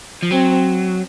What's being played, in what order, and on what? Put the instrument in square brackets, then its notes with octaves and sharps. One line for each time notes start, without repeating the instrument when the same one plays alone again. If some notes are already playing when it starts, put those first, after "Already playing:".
[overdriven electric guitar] F3
[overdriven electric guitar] F#3 [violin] C4